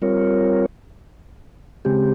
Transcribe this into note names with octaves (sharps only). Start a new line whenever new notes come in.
G3 C4 F4 A#4 C#5
C#3 G#3 C4 G4